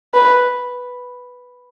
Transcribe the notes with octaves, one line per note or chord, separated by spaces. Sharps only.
B4